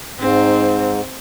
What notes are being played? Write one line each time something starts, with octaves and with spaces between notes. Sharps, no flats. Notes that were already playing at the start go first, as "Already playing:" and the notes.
G#2 C4